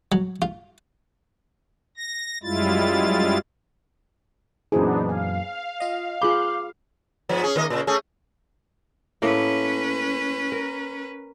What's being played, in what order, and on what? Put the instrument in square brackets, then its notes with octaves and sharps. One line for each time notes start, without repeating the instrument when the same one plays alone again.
[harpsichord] F#3
F4
[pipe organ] A#6
F#2 G3 G#3 E4 F4 A6
[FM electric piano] F#2 A#2 E3 [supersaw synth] B3 D4 D#4 [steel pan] G#4 C5
[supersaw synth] F5 [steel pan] G#5
[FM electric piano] F4 D#5
[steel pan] F4 G#4 B5 [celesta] D6 [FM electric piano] F#6 G6
[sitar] G#2 F3 B3
C#4 G#4
D#3 A#3 D#5
A#2 C#3
A3 C#4 G#4
[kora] A2 A3 A#3 [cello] C#4 B4
[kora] A#4